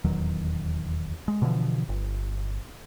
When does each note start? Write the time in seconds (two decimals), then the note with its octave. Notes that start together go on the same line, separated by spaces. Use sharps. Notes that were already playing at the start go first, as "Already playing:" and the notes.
0.05 D#1 E2 D#3 F#3
1.28 G#3
1.42 B2 D3 E3 F3
1.89 G1